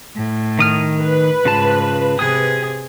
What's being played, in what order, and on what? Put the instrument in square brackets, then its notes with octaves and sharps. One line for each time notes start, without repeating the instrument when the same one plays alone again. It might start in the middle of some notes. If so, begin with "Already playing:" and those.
[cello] A2
[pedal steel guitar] D#3 D#6 F6
[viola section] B4
[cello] G#2 [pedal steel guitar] C#3 F4 A5
[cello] C3 G#4 [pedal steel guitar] D#6